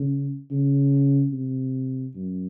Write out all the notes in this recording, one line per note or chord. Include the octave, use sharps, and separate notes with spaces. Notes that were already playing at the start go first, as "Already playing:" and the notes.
Already playing: C#3
C#3
C3
F#2